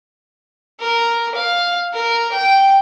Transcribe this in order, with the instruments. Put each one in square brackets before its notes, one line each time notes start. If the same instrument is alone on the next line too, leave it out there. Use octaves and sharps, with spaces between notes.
[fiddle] A#4
F5
A#4
G5